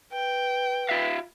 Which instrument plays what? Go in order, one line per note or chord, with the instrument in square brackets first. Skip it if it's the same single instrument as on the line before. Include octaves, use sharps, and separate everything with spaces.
[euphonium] B4 [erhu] G5
[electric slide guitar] F4 E5 F5